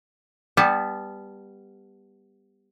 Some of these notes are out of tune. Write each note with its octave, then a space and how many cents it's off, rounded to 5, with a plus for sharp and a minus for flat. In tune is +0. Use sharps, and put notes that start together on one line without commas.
G3 +15 B3 +0 A5 -15